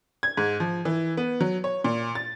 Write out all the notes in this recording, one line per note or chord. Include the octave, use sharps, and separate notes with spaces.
G#6
G#2
F3
E3
B3
F#3
C#5
A#2
A6